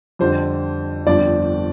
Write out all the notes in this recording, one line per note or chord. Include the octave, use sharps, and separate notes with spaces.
F2 D3 G3 C4 C5
G1 F2 D3 F3 C4 D5